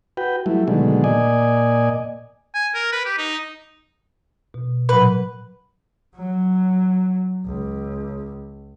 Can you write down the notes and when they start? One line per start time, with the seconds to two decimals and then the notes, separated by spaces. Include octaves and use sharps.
0.17 F#4 B4 G5
0.46 F#3 G3 A3 E4
0.68 B2 D3 D#3 F#3 G#3 A3
1.04 A#2 D5 D#5 G#5
2.55 G#5
2.75 A#4
2.92 B4
3.06 G4
3.18 D#4
4.54 B2
4.89 A#2 F#3 B4
6.17 F#3
7.46 C#2